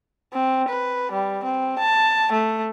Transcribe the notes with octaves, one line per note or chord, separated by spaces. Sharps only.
C4
B4
G3
C4
A5
A3